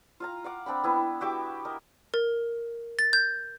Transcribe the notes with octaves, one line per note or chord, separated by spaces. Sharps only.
F4 F5 A#5
F5 F#5 D6
C4 D4 G5 B5
B3 E4 B4
F#4 G4 E5 D6
A#4 D#5
A#4
A6
G6